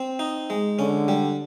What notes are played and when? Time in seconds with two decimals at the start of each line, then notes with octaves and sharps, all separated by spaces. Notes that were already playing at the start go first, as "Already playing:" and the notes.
Already playing: C4
0.19 D#4
0.50 G#3
0.79 D3 C#4
1.08 G3